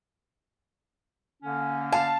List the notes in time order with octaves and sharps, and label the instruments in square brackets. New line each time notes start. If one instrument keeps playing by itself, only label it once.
[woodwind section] D3 A#3 C#4
[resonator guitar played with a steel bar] F5 [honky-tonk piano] A5